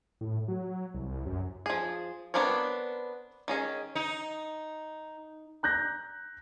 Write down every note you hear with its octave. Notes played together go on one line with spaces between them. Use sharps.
A2
F#3
C2
F#2
F3 G#4
B3 C4 D4 A#4 C#5
D#3 C#4 G#4
D#4
A#5 F#6 G6 A#6